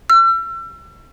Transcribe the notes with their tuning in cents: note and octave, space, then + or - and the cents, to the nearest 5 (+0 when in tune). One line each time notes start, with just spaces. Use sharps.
E6 +40